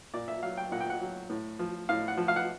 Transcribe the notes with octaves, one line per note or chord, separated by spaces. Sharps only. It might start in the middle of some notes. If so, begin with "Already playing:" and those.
A#2 D5
E5
F#3 F5
G5
A#2 F#5
G5
F#5
F#3
A2
F3
A2 F5
F#5
F3
F5
F#5